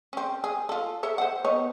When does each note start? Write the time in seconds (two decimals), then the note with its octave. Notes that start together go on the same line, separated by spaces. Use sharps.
0.13 C4 C#4
0.44 G#4
0.69 F4 A4
1.03 A4 C#5 E5
1.18 C5 F#5
1.45 B3 D#4 C#5